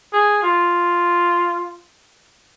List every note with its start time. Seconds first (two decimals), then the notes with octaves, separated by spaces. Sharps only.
0.13 G#4
0.43 F4